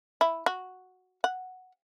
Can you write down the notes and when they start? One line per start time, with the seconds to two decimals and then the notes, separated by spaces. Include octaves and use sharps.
0.21 E4
0.46 F#4
1.24 F#5